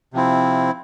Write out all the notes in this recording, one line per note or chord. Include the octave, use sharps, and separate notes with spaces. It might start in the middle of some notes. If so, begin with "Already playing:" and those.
C3 F3 C4 E4